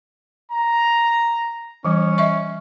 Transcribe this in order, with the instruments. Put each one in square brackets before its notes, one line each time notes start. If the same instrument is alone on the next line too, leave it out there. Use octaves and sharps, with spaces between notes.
[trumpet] A#5
[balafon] E3 G3 [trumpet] C#4
[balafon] D#5 E5 C#6